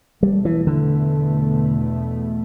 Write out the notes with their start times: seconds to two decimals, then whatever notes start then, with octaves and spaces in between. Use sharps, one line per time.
0.22 E2 B2 G3 A3
0.45 E3
0.67 D3